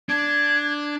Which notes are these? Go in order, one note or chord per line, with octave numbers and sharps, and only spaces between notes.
D4 G#6